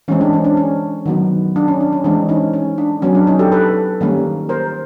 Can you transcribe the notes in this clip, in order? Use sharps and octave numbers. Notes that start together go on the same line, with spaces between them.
E3 G#3 C4 C#4
D4
C#4
D4
C#4
D#3 F#3 B3
D4
C#4
D4
C#4
E3 G#3 C4 D4
C#4 D#4
C#4
D4
F#3 B3 C#4
D4
C#4 D#4
G4 A4
A4 B4
D#3 G3 A#3 C#4
A#4 C5